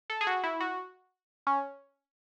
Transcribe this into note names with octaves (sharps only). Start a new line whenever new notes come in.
A4
G#4
F#4
E4
F#4
C#4